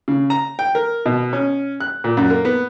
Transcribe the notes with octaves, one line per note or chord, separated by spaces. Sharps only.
C#3
A#5
G5
A#4
B2
C#4
F#6
A#2
F#2
A#3
B3